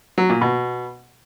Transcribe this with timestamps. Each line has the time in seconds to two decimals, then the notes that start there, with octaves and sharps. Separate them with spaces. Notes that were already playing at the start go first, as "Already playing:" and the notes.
0.18 F#3
0.29 A#2
0.41 B2